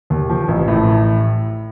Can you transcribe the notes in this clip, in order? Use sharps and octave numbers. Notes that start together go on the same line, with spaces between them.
D#2
F3
A1
A2